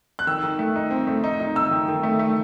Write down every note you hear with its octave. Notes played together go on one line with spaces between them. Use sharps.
F#6
D#3 E6
D#3
A3
D#4
C4
A3
D#4
D#4
D#4 E6
D#3
D#3
A3
A3